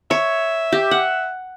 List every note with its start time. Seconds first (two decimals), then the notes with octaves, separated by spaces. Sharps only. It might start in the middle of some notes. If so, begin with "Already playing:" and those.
0.11 C#5 E5
0.72 G4
0.91 F#5